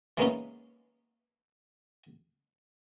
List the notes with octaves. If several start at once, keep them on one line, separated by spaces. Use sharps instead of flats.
E3 G#3 A#3 B3 C#4 D#4